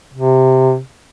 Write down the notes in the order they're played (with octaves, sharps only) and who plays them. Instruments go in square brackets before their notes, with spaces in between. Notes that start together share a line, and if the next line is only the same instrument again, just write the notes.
[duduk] C3